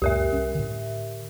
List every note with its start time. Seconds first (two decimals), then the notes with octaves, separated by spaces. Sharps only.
0.02 C#2 F#2 A#2 G4 A#4 E5
0.33 C2 C#4
0.55 A2 D3